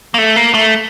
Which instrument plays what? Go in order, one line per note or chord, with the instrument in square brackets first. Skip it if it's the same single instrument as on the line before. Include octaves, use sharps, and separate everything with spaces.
[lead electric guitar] A#3
A3
A#3
A3